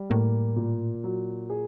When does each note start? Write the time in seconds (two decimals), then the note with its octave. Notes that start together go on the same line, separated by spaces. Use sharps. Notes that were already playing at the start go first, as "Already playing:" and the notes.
Already playing: G3
0.10 A2 A#3
0.56 A#2
1.04 F#3
1.50 G#4